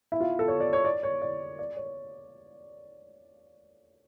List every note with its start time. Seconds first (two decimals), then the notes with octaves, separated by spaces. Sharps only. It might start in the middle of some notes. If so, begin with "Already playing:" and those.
0.12 E4
0.20 F4
0.39 A4
0.48 C#5
0.60 D5
0.73 C#5
0.85 D5
1.03 C#5
1.22 D5
1.59 D5
1.77 C#5